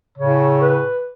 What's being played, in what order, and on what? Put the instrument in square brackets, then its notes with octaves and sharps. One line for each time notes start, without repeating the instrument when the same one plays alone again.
[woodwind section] A2 C#3 [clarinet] C#5
[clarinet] B4